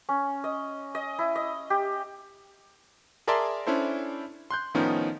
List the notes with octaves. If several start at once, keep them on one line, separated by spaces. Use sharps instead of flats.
C#4
D#5
D#5
E4
D#5
G4
G#4 A#4 D5 E5 A5 C6
C#4 D4 E4 A4 C5
C6 F#6 G6
A2 D#3 F3 B3 C#4 D#4